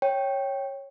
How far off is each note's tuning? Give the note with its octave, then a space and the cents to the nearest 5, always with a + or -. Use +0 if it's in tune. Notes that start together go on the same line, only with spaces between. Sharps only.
C#5 -10 G5 +0